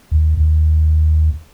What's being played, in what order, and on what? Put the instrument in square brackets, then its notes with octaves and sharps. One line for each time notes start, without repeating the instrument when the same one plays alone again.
[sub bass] D#2
D#2